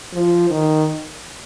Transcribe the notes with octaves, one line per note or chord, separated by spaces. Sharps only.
F3
D#3